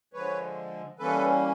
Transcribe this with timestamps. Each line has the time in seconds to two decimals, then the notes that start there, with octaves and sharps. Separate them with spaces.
0.13 D3 F3 G#3 B4 C#5
0.99 E3 G3 A#3 C#4 A4 B4